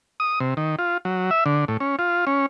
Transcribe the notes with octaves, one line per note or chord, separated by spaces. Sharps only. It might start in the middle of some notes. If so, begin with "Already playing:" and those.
D#6
C3
D#3
F4
F#3
E5
D3
A2
C#4
F4
C#4